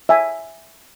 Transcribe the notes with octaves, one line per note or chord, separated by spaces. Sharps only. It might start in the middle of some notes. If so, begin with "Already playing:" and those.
E5 G#5